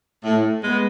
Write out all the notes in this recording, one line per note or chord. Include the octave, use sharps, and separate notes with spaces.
A2
G#3 B3